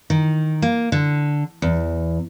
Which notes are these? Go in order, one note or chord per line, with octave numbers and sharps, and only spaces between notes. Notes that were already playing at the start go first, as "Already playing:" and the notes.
D#3
A#3
D3
E2